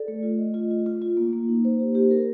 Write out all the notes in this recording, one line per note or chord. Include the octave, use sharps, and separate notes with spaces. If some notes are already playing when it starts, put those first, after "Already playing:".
Already playing: A4 D5
A3
F4
D#5
F4
F4
F4
F4
A#3
A#3
D#4
C5
G4
G4
A#4